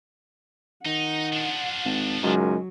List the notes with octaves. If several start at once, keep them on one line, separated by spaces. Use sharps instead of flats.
D#3 D#4 F#5
F3 D4
G#1
C#2 F#2 D#3 F#3 G#3